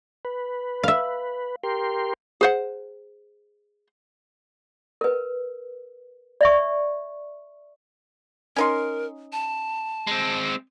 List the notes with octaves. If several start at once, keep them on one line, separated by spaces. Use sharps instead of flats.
B4
E5 F5
G4 A#4 C6
G#4 C5 F#5
A#4 B4
D5 E5 C#6
C#4 D#4 A#4 C6
A5
G#3 C4